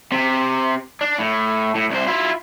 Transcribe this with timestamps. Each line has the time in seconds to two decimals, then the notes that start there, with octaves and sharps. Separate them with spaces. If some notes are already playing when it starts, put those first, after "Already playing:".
0.12 C3
1.01 D4
1.19 A2
1.75 A2
1.90 C2 C5
2.07 E4 F4